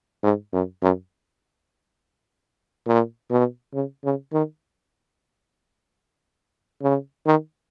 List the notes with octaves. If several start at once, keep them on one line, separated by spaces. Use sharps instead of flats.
G#2
F#2
F#2
A#2
B2
C#3
C#3
D#3
C#3
D#3